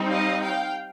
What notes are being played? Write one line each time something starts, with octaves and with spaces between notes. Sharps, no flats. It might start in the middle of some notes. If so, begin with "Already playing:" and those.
Already playing: G3 C4 D#4
D#5 F5
F5 G5